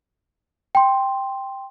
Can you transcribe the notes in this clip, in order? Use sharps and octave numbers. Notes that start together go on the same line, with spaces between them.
G5 C6